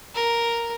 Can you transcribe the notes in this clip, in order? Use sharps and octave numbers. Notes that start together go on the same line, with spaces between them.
A#4